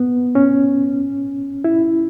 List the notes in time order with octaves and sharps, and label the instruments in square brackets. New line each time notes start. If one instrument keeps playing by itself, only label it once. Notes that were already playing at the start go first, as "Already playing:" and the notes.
Already playing: [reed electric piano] B3
C#4
E4